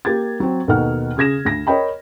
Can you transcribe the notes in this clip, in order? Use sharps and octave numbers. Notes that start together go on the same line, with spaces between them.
A#3 G4 G#6 A6
F#3 C4
D#2 B2 D#4 A4 F#5 F6
C#3 G#4 G#6 A#6 E7
D2 A#6
A#4 C#5 D#5 G5 B5